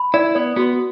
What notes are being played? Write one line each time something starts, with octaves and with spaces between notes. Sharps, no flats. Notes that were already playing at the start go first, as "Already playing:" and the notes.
Already playing: B5
E4 D5
B3 D5
B3 F#4